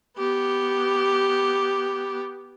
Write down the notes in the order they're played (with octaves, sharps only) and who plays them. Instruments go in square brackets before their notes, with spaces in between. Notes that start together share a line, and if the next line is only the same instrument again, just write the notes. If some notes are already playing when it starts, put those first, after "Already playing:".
[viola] B3 G4